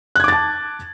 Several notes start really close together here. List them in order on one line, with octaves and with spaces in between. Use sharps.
F#6 G#6 D6 A6 A5